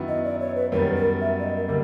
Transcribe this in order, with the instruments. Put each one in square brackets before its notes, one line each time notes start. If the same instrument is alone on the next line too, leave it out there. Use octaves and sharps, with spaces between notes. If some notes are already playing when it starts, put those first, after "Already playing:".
Already playing: [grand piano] F#2 D#3 F#3 B3 E4
[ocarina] D#5
D5
C#5
B4
[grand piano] F#2 D#3 G3 B3 [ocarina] A#4
[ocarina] A#4
E5
D5
D#5
A#4
[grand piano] D3 G3 A#3 [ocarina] A#4